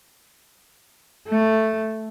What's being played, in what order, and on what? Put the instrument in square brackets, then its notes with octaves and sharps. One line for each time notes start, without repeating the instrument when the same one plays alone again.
[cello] A3